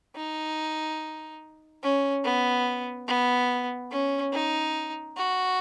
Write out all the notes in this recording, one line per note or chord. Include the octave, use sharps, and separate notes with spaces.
D#4
C#4
B3
B3
C#4
D#4
F#4